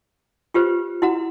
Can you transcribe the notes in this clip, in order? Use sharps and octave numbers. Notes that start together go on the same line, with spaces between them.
F4 G4 B4 C5
E4 F#4 F#5 A#5